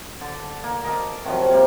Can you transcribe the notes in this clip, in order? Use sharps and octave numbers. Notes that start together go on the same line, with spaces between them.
D3
A#3
A#4 D#5 F5 A5
C3 D#3 F3 F#3
C3 G3 A#3